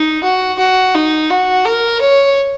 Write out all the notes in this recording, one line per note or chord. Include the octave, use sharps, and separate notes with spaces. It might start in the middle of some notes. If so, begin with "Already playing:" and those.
Already playing: D#4
F#4
F#4
D#4
F#4
A#4
C#5